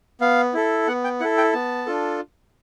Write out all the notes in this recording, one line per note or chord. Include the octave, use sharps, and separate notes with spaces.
B3 F5
E4 A4
B3 F#5
G5
E4 A4 F#5
G5
B3 A5
D4 F4 A4